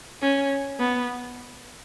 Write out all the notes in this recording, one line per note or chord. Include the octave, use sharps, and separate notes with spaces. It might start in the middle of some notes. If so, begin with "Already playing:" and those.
C#4
B3